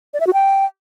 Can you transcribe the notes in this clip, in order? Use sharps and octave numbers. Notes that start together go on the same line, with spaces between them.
D5
E5
F#4
G5